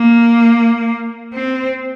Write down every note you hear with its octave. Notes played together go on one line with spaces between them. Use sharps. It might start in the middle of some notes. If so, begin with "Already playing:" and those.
Already playing: A#3
C4